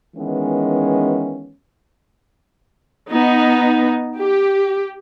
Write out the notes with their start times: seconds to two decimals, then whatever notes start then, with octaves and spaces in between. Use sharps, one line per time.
0.16 D#3 E3 G#3 B3 C#4
3.11 B3 D#4
4.18 G4